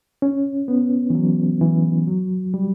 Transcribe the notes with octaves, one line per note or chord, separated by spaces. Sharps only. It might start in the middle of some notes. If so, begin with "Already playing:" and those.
C#4
B3
E3
F#3
E3
F#3
G3